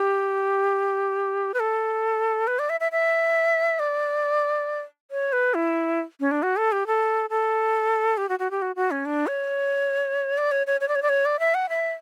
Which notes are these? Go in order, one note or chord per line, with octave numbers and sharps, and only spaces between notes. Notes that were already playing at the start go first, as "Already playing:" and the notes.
Already playing: G4
B4
A4
B4
D5
E5
E5
E5
D5
C#5
B4
E4
C#4
D4
F#4
A4
G4
A4
A4
G4
F#4
F#4
G4
F#4
F#4
C#4
D4
C#5
D5
C#5
C#5
C#5
D5
C#5
D5
C#5
D5
E5
F#5
E5